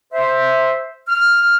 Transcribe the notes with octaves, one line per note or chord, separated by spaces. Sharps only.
C5 E5
F6